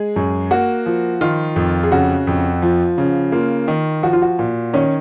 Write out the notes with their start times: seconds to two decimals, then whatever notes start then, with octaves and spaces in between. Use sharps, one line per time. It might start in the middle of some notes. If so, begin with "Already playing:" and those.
Already playing: G#3 G#4
0.16 F#2
0.51 A#3 F#4
0.86 F3
1.21 D#3 F4
1.56 F2
1.83 G#4
1.92 C#3 F#4
2.27 F2
2.62 F3
2.98 C#3
3.32 A#3 F4
3.68 D#3
4.03 F3 F#4
4.13 F4
4.22 F#4
4.39 A#2
4.74 D#3 C#4 C#5